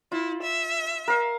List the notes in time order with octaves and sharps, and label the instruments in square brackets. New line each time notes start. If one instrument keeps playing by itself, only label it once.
[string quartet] E4 [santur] F4
[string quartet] E5
[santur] A#4 F5